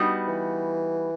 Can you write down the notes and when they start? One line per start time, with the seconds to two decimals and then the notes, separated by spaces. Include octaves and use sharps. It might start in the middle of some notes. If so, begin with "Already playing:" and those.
Already playing: G3 B3 D#4 F#4
0.28 E3